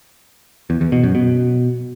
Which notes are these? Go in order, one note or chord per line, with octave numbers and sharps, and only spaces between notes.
E2
E2
B2
F#2
B2